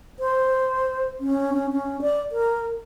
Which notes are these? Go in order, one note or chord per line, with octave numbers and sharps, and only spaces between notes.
C5
C#4
C#4
C#4
D5
A#4